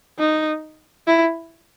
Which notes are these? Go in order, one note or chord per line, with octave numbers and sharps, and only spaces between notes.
D#4
E4